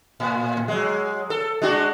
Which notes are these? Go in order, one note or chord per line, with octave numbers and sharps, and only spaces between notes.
A2
F#3 G#3
A4
G#3 D4 F#4